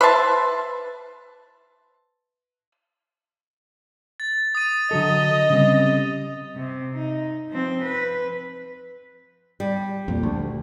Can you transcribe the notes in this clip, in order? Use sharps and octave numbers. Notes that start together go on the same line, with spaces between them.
B4 C5 E5 A5
A6
D#6 A6 D#7
D3 F#3 A4 D#5
C#3 G3 C4
C3
D#4
F3 C4
B4
G3
F2 A#2
D2